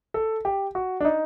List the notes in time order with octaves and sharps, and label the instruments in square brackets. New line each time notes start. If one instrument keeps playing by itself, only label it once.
[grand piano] A4
G4
F#4
D4
D#4